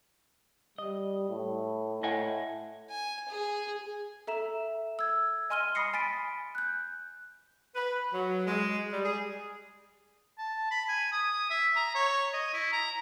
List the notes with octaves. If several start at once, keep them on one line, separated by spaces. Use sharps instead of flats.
G3 D#5
A2
A2 D#5 F#5 G#5
G#5
G#4
A4 E5 A#5 E7
E6 G#6
D#5 G#5 C6 F6 D#7 G7
B5 C6 D#6 A#6 C7 C#7
G#5 A6 B6 D7
F#6 G6
B4
F#3
G#3
G3
G#4
A5
B5
G#5
D#6
E5
A#5
C#5
D#5
E4
A#5